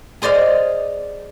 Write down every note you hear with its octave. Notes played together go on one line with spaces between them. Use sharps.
G#4 C5 D5 D#5 F5